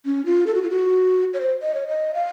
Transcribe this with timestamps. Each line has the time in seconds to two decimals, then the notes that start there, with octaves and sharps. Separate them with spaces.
0.06 C#4
0.26 F4
0.47 A4
0.55 F#4
0.62 F4
0.70 F#4
1.34 C#5
1.40 C5
1.62 D#5
1.74 C#5
1.88 D#5
2.14 F5